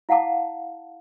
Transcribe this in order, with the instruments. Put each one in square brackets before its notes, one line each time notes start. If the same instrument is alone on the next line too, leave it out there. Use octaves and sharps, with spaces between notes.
[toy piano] E4 F5 F#5 A5 D6